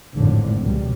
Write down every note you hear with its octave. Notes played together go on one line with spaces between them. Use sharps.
G#1 F2 A2 D3
C#2 B2 G3